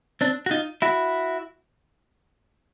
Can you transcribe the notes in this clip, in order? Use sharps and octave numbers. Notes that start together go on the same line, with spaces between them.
C4 D4
F#4
D#4 F4
E4 F#4